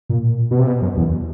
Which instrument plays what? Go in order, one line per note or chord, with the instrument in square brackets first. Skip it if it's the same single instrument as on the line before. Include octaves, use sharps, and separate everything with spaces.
[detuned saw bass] A#2
B2
C3
B2
F#2
E2